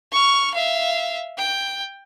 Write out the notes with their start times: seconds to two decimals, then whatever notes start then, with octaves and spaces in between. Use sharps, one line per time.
0.12 C#6 F6
0.54 E5 F5
1.38 G5